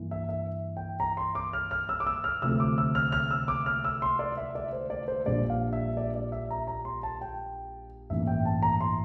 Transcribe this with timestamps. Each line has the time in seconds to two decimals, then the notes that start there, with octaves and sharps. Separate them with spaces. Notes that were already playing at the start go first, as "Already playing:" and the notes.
Already playing: G2 E3 A#3
0.11 E5
0.29 E5
0.77 G5
1.00 A#5
1.17 C6
1.35 D6
1.53 F6
1.71 F6
1.89 E6
2.00 D6
2.07 E6
2.24 F6
2.42 D2 C3 F3 A3 E6
2.60 D6
2.78 E6
2.95 F6
3.12 F6
3.31 E6
3.48 D6
3.66 F6
3.84 E6
4.02 C6
4.19 D5
4.37 E5
4.55 D5
4.73 C5
4.90 D5
5.08 C5
5.26 A#1 A#2 G3 D4 D5
5.50 F5
5.73 E5
5.97 D5
6.15 D5
6.32 E5
6.51 A#5
6.67 A#5
6.85 C6
7.03 A5
7.21 G5
8.10 A1 G2 E3 A#3 E5
8.27 G5
8.45 A5
8.62 A#5
8.81 C6